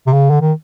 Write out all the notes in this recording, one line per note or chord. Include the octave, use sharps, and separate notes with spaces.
C3
C#3
D3
D#3